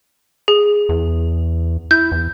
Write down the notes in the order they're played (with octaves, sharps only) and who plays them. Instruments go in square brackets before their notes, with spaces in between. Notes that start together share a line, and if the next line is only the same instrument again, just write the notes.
[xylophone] G#4
[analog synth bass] E2
[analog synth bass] E4 [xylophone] G6
[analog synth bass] E2